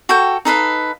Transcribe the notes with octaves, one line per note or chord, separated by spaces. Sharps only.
F#4 A4 G5
D#4 A4 B4 F5